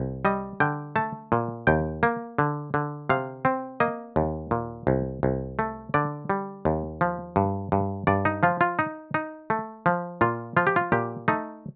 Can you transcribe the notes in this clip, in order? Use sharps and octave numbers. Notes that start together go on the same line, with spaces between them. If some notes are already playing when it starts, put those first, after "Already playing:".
Already playing: C2
G3 D#5
D3 G5
A3 A5
A#2
D#2 G5
A#3
D3
D3
C3 F5
C4
A#3 D#5
D#2
A#2
C2
C2
A3
D3 D5
G3
D#2
F3
G2
G2
G2 D5
D#4
F3 F4
F4
D#4
D#4
A3
F3
A#2 F4
F3 F4
G4
F4
A#2 G4
A3 D#4